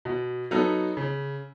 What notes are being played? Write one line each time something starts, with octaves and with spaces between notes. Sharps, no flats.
B2
F#3 B3 D#4 A4
C#3